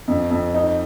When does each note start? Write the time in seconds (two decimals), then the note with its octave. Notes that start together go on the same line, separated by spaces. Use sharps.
0.08 F2
0.31 F2
0.54 D#4